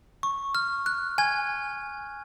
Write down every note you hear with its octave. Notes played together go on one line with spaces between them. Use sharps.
C#6
F6
F#6
G#5 G#6